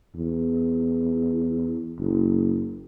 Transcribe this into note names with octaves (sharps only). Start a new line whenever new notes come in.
E2
F#1